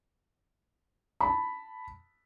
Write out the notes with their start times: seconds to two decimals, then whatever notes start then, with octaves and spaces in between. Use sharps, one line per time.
1.21 A5 B5